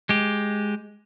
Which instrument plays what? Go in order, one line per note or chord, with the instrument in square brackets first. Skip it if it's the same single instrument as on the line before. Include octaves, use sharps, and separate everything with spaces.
[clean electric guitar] G#3 G4